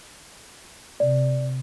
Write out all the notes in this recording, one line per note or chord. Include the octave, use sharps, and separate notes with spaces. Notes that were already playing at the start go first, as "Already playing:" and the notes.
C3 D5